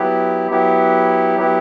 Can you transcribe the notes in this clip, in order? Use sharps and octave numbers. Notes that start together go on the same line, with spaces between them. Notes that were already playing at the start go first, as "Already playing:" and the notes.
Already playing: F#3 B3 E4 G4
F#3 B3 E4 G4
F#3 B3 E4 G4